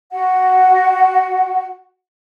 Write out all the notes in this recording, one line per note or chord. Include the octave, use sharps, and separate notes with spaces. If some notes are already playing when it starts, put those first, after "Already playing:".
F#4 F#5